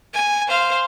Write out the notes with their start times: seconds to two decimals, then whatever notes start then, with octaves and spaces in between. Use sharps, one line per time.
0.14 G#5
0.48 C5 F5